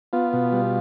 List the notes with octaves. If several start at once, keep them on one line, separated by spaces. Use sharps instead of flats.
B3 F4
B2
G3